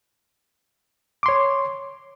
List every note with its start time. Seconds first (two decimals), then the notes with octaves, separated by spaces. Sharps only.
1.23 D6
1.26 C6
1.29 C#5